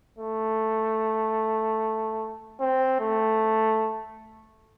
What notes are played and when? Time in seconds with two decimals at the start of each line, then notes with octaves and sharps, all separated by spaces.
0.18 A3
2.60 C4
3.00 A3